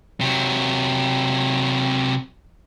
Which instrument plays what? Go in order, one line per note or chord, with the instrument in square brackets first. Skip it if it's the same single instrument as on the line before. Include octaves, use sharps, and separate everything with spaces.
[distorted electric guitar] C3 F#3